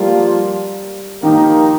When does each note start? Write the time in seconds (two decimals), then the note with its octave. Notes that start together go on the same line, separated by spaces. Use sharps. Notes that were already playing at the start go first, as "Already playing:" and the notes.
Already playing: F3 G3 A#3 F4
1.22 D#3 F3 A#3 D#4 G4 A#4